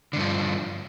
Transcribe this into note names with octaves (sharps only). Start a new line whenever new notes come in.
G2 D3 F3